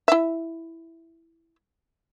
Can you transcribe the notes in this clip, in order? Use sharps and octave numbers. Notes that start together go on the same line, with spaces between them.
E4 E5